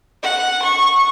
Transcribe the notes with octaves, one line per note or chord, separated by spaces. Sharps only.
F#5
C#6